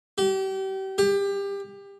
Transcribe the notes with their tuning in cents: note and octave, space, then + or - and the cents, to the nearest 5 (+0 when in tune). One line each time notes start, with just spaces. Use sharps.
G4 -35
G4 +25